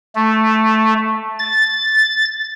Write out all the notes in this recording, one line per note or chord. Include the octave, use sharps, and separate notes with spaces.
A3
A6